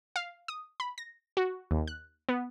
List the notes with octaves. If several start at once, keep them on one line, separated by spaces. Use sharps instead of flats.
F5
D#6
B5
A#6
F#4
D#2
F#6
B3